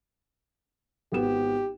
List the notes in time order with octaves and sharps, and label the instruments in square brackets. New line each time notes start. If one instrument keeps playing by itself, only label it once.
[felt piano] G#1 B3 E7 [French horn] G4